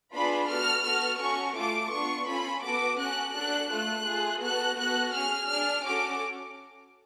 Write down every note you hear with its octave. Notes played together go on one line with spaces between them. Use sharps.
B3 D4 F4 G#4 B5
B3 F#4 A4 F6
B3 F#4 A4 F6
C#4 F#4 A4 C#6
A3 F4 A4 D6
B3 D4 F4 C#6
C#4 F4 A4 B5
B3 F#4 A4 D6
C#4 F#4 A4 F#6
D4 F#4 A4 F#6
A3 F4 A4 F#6
A3 F4 G#4
B3 F#4 A4 F#6
B3 F#4 A4 F#6
C#4 G#4 F6
D4 G#4 F6
C#4 F#4 A4 D6